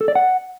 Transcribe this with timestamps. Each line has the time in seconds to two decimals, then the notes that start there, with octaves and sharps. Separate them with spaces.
0.01 A4
0.08 D5
0.15 F#5